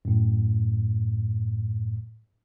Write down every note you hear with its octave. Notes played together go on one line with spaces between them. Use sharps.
F#2 A2